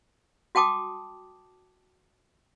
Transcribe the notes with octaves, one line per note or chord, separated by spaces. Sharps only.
F#4 G5 A5 D6 D#6